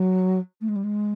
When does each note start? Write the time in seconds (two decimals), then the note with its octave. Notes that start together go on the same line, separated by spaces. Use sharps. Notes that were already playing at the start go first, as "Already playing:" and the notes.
Already playing: F#3
0.60 A3
0.68 G#3
0.75 G3
0.83 G#3